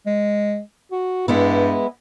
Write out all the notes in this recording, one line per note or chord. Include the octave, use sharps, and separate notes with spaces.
G#3
F#4
G2 G#3 B3 E4